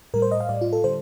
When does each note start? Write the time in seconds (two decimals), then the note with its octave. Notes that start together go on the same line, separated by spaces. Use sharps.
0.14 A2 G3 A#4
0.22 C5
0.31 D#5
0.40 F5
0.49 A2 G3 D5
0.61 F4
0.73 A4
0.84 D3 G3 C5